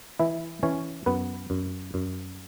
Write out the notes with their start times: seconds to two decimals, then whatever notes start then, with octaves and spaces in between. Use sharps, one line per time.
0.20 E3 E4 E5
0.63 E3 C#4 C#5
1.06 F#2 B3 B4
1.50 F#2
1.94 F#2